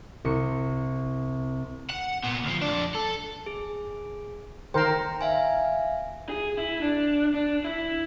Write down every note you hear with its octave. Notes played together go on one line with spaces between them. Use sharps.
C2 C#7
F#5
A#2 B3
D2 F3
F2 D4
A4
G#4
D#3 A#4 C5 G5 A#5
E5 F5 G#5
G#4
E4
D4
D4
E4